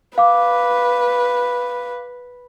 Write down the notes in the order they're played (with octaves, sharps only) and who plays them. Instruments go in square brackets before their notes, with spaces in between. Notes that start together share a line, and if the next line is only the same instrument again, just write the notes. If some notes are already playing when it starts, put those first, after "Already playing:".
[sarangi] B4 [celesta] F5 D6